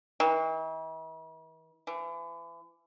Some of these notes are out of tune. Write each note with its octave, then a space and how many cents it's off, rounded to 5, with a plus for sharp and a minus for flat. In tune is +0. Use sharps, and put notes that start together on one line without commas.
E3 -45
E3 +35